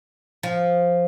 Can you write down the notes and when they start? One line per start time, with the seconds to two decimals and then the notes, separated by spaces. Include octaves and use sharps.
0.43 F3